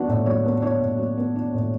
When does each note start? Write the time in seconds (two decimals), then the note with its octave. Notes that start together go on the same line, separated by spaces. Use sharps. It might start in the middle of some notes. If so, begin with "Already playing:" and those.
Already playing: F#3 B3 D4 F#4 F#5
0.09 A2
0.26 F#3 C#5
0.45 B3
0.62 D4 C#5
0.81 A2
0.98 F#3
1.17 B3
1.36 D4
1.54 A2